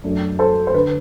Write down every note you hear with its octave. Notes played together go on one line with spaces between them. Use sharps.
F#2 F#3 A3 D4
A4 C5
C5
D3 B4